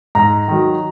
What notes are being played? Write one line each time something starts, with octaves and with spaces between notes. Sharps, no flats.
G#2 A#5
D#3 F#3